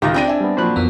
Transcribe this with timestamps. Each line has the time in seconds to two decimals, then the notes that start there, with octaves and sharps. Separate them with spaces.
0.02 C#2 D#3 F4 G4 A#6
0.14 C4 D4 D5 G5 A#6 D#7
0.28 E5 G#5
0.40 G3 B3
0.57 A#2 F3 F#3 C5 B5 F#6
0.76 F2 E3 A#3 B3